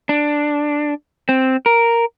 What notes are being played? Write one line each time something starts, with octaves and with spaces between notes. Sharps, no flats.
D4
C4
A#4